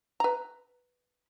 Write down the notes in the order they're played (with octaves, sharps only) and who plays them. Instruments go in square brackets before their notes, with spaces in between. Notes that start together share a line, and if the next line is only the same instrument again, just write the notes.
[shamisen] B4 A#5